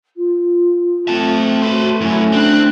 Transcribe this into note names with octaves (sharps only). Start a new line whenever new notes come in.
F4
A3 C4 A5
F#4 B4 C5
F#2 A3 C#4 E4
C4 D4 F#6